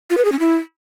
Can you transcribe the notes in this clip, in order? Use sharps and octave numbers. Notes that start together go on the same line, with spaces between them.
F4
B4
G#4
C#4
E4